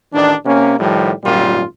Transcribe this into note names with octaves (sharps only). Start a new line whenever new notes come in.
A1 D#3 D4
C3 A#3 C#4
A2 D#3 F3 G3
G#1 F#2 A#2 G3 F4